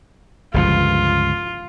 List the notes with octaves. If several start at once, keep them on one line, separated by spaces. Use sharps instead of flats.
G1 C#2 F3 F4